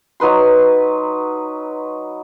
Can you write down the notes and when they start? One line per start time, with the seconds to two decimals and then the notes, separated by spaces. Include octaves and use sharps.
0.20 F#3 D#4 B4 C6